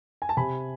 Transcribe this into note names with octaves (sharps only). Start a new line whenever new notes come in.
G#5
A5
C3 G#5 B5